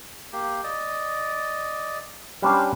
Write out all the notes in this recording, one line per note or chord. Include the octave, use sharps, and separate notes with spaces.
A#3 G4
D5 D#5
G3 C#4 D4 B4 C5 F5